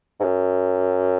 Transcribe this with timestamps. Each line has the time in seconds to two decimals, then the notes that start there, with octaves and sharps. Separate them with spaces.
0.20 G#2
0.24 F#2